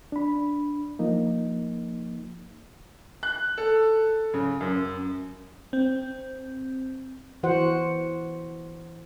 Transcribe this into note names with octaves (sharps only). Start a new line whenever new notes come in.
D4 B5
F3 A#3 D#4
F#6
A4
C#3
F#2
C4
E3 F#4 C5 F#5